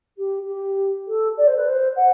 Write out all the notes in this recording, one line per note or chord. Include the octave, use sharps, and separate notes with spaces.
G4
G4
A4
D5
C5
B4
C5
F#5